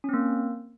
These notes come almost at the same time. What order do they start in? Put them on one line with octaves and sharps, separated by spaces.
C#4 C4 A#3